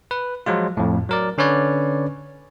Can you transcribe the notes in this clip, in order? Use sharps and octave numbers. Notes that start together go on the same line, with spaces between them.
B4
F3 F#3 G#3 F4
F2 A2
F#3 A#4 D5
D3 C#4 B4 C#5 D5